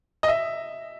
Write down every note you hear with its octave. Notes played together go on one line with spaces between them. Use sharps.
D#5
E5